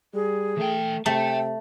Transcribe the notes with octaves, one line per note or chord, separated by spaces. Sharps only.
G3 G#4
E3 A3 G5
C3 A3 E5 G5 A5